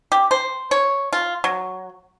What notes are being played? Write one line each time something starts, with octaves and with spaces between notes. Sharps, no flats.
G4
C5
C#5
F4
F#3